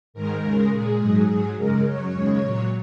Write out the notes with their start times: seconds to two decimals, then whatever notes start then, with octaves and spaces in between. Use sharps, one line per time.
0.14 G#2 D#3 G#3 A#4
0.43 D#2 C#3 G#3
0.71 A#2 G#3 G#4
1.00 G#2 F#3
1.28 G#2 F#3
1.57 F#2 C#3 G#3 A#4
1.85 F#2 F#3 C#5
2.13 D#2 C#3 G#3
2.43 A#2 F#3